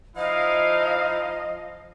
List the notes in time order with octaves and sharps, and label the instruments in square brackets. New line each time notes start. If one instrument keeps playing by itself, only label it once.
[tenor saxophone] F3 [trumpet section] D#4 E4 F5 [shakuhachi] D#5